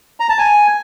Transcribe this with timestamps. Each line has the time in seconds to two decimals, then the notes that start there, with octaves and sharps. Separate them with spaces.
0.20 A#5
0.29 A5
0.38 G#5